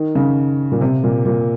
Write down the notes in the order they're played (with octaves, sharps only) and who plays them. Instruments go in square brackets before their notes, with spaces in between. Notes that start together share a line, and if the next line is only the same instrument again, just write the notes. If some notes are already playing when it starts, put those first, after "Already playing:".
Already playing: [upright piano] D#3
C#3
A#2
C3
A#2
A#2